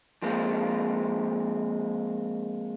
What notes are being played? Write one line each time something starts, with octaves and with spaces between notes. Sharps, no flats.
F3 G#3 A#3 C4